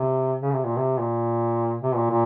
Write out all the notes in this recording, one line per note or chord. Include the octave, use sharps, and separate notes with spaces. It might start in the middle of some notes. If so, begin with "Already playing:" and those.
Already playing: C3
C#3
C3
A#2
C3
A#2
C3
A#2
A#2